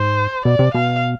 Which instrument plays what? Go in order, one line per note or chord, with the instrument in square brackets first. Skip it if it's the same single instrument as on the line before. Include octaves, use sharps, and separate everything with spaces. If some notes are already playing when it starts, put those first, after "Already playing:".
Already playing: [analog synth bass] G#2 [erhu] C5
[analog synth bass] B2 [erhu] D5
[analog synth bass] C3
[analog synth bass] B2 [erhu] F5